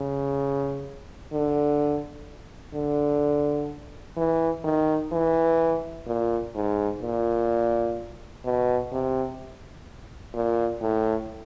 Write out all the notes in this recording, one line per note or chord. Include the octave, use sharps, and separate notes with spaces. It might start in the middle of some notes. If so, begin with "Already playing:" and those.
Already playing: C#3
D3
D3
E3
D#3
E3
A#2
G#2
A#2
B2
C3
A#2
A2